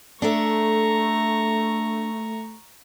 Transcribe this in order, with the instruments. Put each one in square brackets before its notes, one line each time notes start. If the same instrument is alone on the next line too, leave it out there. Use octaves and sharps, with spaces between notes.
[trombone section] A3 [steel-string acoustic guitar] D4 A4 E5 [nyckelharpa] A#5 C#6